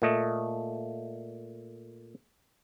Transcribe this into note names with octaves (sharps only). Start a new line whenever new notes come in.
A#2 A3 D#5